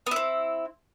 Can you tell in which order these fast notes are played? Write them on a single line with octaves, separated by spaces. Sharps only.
B3 E4 C4